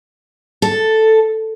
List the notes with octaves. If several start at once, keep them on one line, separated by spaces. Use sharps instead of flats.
A4